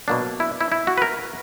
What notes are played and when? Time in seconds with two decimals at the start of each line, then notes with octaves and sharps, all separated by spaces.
0.08 B2 F#3 A#3 D4
0.40 E4
0.61 E4
0.72 E4
0.87 F#4
0.98 B4
1.02 A#4